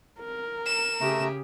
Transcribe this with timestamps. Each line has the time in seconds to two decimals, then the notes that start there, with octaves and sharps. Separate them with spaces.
0.20 A#4
0.66 E7
1.01 C#3 A3 G4 G#4 A#5